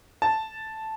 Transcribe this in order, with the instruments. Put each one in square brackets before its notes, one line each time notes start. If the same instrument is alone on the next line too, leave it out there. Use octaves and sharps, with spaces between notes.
[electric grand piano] A5